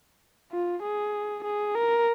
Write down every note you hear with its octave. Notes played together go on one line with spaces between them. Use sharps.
F4
G#4
G#4
A#4